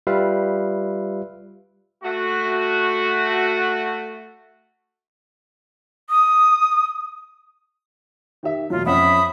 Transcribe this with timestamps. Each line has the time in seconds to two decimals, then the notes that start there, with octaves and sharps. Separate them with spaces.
0.07 G3 F4 B4 E5 F5
2.04 A3 F#4
6.10 D#6
8.43 D#3 G4 E5
8.70 E1 F#3 F4
8.86 F2 C#4 E5 F#5 B5 D#6